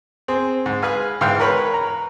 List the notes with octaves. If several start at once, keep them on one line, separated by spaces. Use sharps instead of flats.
C4 G#4
G#2
G#4 B4 F5 G#5
G#2 E3 F5 G5
A#4 B4 C#5 B5
A#5